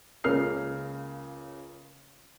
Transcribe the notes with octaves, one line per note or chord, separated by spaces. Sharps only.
C#2 C#3 A#3 F6 C7